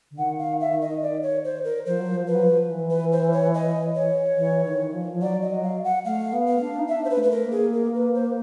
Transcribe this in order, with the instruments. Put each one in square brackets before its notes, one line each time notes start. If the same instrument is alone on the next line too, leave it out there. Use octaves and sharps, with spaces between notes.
[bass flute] D3
[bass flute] D#3 [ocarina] F#5
[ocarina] F5
E5
D#5
D5
C#5
C5
A#4
[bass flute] F3 [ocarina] C5
[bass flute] F#3
F3
[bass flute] F3 [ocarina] B4
[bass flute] F#3
F3
E3
[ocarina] B4
C5
C#5
D#5
C#5
[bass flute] E3
D#3
F3
F3
[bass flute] F#3 [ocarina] D5
[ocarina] D#5
[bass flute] F#3
[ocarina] F5
F#5
[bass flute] A3 [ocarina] F5
[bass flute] B3
[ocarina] F5
[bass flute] D4
D#4
[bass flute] D4 [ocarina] E5
[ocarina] C5
B4
[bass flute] A3
[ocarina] B4
A#4
[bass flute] A#3
[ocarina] G#4
A#4
B4
C5